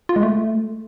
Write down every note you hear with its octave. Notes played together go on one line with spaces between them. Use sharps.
F4
G#3
A3